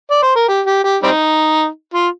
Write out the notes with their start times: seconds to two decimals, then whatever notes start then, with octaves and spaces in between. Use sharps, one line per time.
0.11 D5
0.23 C5
0.36 A#4
0.48 G4
0.66 G4
0.84 G4
1.03 G3 C4 D#4
1.94 F4